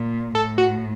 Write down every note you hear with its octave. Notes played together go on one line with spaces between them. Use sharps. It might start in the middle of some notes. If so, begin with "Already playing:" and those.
Already playing: A#2
A2 A4
F#4